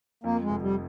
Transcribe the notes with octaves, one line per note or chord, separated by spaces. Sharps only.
F2 A#3
G#3
F1
G3